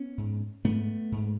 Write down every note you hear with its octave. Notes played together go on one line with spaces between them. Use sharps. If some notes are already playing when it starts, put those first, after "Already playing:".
Already playing: B3 C#4
G#2
G#2 A3 B3
G#2